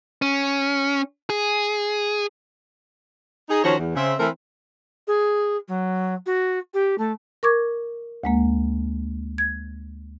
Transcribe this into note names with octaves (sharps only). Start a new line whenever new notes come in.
C#4
G#4
D#4 G#4
D#3 F3 C#4 F#4 C5 C#5
E2
C#3 C4 E5
E3 A3 C4 E4 A#4
G#4
F#3
F#4
G4
A3
A#4 C#6 D6 G#6
D2 G#3 A#3
G#6